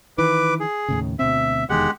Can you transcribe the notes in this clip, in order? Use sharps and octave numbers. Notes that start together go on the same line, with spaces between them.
D#3 E3 B4 D6
G#4
D#2 A2 C#3
D2 B2 C4 E5
F1 E2 D#3 G#3 G4 F#5